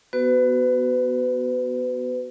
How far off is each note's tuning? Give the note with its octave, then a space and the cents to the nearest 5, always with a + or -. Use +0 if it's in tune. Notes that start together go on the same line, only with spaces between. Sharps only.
B3 +0 F#4 +15 B4 +35